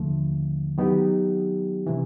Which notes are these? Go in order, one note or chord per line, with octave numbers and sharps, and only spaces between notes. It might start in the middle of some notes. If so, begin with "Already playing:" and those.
Already playing: D#2 D3 F3 A3
D#3 F#3 B3 D#4 G4
C3 E3